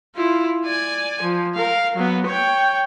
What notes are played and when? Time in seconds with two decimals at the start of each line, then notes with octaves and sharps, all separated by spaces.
0.15 E4 F4
0.65 D5 G#5
1.22 F3
1.54 A#4 F5
1.95 F#3 B3
2.26 C#5 G5